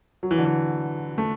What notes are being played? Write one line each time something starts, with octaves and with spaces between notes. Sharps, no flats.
F#3
E3
D3
E3
A3